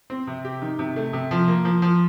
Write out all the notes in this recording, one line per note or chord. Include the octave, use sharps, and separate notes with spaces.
C4
C3
G4
D#3
C3
A3
C3
F3
A#3
F3
F3